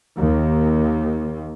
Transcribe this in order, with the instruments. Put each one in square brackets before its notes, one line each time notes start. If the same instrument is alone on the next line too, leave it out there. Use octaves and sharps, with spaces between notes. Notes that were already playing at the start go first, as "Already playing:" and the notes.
[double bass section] D#2